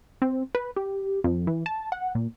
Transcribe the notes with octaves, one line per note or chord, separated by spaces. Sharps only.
C4
B4
G4
F2
E3
A5
F#5
A#2